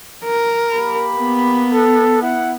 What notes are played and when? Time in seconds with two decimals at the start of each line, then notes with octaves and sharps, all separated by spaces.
0.24 A#4
0.72 A#3 G4 B5
1.17 B3
1.73 A4
2.21 E4 F#5